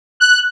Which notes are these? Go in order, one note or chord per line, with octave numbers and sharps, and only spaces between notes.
F#6